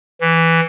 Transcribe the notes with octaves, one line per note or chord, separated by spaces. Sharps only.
E3